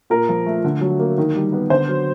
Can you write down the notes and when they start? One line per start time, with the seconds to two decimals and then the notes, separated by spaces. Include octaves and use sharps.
0.10 A#2 A#4
0.29 F3
0.46 A3
0.64 D3
0.81 F#3
0.99 A#3
1.18 D#3
1.36 G3
1.53 B3
1.70 D3 C5
1.88 F#3